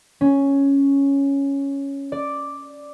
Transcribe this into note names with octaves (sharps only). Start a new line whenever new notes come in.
C#4
D5